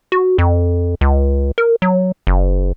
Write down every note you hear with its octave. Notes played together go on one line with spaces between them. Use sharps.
F#4
F2
C#2
A#4
F#3
F#1